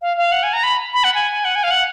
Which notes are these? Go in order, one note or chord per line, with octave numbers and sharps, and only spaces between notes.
F5
F5
F#5
G#5
A#5
B5
B5
F#5
G#5
F#5
G#5
F5
F#5